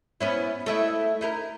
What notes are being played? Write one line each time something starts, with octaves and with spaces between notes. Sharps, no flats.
B3 C#4 E4
A3 E4 D#5
D#4 E4 A#4